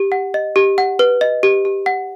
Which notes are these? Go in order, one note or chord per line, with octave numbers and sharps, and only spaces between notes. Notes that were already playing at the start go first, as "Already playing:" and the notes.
Already playing: G4
F#5
D#5
G4
F#5
B4
D#5
G4
G4
F#5